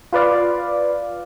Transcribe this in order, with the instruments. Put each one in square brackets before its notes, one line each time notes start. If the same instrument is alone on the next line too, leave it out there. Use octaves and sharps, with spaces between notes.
[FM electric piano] F4 B4 D5 F5